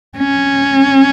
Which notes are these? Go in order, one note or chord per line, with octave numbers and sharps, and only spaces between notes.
C#4